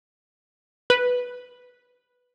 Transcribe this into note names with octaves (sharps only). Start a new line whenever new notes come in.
B4